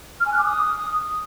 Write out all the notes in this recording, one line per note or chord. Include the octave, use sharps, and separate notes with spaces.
F6
G#5
F#6
D6
D#6